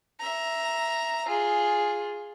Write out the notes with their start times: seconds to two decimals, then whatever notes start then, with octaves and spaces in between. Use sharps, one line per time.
0.20 E5 A#5
1.28 F4 G#4